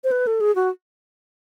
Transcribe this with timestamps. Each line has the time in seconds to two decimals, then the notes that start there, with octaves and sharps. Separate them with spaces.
0.04 C5
0.11 B4
0.27 A4
0.41 G#4
0.55 F#4